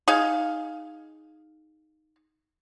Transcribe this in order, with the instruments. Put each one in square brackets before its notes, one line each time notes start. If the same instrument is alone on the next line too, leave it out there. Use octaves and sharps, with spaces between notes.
[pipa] D#4 G#4 F5